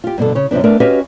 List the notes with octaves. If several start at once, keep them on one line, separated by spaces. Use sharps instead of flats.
F4 G4
G2 B2 D3 A4
C#3 C#5
F#2 C3 F3 B3 D4
A3 B3 D4 A#4 D5
C#4 F#4 G4 B4 D#5 F5